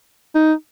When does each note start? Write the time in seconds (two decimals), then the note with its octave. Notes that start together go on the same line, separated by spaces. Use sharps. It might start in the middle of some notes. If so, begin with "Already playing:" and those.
0.35 D#4